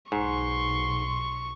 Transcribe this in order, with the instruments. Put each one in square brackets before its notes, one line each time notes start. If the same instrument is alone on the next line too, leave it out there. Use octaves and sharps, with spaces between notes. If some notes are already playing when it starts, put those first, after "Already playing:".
[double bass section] B1 [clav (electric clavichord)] G#2 [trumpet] C6 [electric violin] C#6